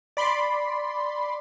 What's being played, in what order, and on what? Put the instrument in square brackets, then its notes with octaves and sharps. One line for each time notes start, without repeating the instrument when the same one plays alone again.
[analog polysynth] D5 B5 C6